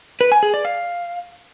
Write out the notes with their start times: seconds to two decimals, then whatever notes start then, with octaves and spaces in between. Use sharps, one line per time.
0.21 B4
0.32 G#5
0.43 G#4
0.54 D5
0.65 F5